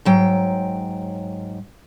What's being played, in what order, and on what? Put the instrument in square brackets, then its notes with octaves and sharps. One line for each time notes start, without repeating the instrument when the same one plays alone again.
[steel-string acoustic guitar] G#2 F#3 G5